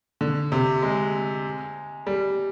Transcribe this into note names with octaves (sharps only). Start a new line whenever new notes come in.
D3
C3
G#3
G3